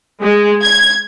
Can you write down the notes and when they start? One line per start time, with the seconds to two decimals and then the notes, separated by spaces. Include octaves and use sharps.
0.23 G#3
0.65 G#6